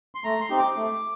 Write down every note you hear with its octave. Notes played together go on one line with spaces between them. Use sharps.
C6
A3 A#5
C6
C4 D#4 G4
D6
A3